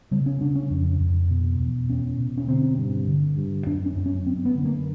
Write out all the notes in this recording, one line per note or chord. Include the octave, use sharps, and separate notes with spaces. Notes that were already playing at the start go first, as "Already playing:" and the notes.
C#3 G3
C#4
C#3 D4
C#4
F2
F2
B2
E2
E2 C#4
B2
C#4
D3 C4
G2
D3
G2
F#2 D4
C#4
F#2
C#4
F#2 C4
B3
D3
A#3